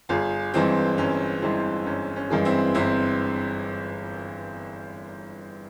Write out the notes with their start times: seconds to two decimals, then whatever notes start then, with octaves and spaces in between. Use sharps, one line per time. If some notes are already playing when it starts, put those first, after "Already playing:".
0.09 G1 F4 G#4
0.54 G2 E3 G#3 C4
0.98 G1 C#4
1.42 G2 E3 G#3 C4 E4
1.86 G1 C#4
2.16 C#4
2.30 G2 E3 G#3
2.45 C4 E4
2.74 G1 C4 E4